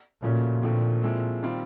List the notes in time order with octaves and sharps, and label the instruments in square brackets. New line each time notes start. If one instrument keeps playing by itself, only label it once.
[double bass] A#2 [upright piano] C#3 F3 A3 C#4 F#4
[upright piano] D#2 D3 F3 A3 C4 [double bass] A#2
[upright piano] F3 G#3 C4 E4 A4
D#3 G3 C4 F4